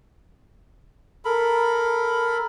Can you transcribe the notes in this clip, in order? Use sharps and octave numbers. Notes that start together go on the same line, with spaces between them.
A4 A#4 B5